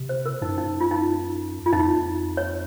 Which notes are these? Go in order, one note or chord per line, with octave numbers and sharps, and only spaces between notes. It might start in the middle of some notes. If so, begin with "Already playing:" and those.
Already playing: C3
C5
A#4
F#2 D#4
D#4
F4
D#4
F4
F2 D#4
C#5